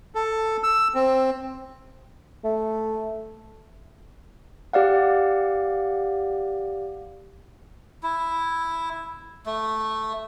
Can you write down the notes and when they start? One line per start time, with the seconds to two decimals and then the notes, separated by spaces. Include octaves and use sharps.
0.15 A4
0.63 E6
0.95 C4
2.44 A3
4.73 G4 D5 F5 F#5
8.03 E4
9.46 A3